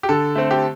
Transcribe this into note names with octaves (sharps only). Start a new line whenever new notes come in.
G4
D3 A4
A3 C4
G4